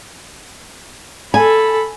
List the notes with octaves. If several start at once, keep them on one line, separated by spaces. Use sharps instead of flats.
A4 G#5 B5